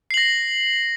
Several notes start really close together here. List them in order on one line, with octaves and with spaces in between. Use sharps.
C7 F#7 A#6